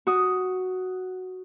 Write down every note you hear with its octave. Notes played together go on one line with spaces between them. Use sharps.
F#4 D#6